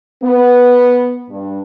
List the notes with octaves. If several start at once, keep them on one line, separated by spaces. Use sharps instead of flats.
B3
G2